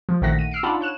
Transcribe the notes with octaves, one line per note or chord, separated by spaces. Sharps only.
F3
A#1 D#3 A3 F#5 A#6 B6
D#7
E6 F6 C7 D7
D4 D#4 F4 F#5 A5 B5
C#5 F#6 E7